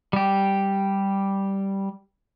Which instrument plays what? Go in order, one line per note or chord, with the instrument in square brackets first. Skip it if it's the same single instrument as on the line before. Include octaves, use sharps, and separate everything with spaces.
[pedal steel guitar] G3 G4